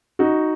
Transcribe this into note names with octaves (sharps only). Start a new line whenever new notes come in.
D#4 F#4